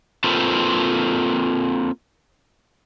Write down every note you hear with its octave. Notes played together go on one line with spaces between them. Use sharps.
A#3 C4 F4 A4 B4 C5